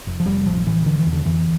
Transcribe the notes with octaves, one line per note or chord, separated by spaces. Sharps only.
F1
F3
F1 G3
A1 F3
A2 E3
D3 E3
E3
E2
D3
F2 E3